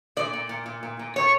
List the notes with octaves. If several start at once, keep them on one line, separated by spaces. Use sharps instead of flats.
A#2 D5
A#2
A#2
A#2
A#2
A#2
A#2 C#5